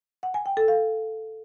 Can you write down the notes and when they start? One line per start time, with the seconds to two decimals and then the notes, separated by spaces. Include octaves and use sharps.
0.23 F#5
0.34 G#5
0.46 G5
0.57 A4
0.68 F5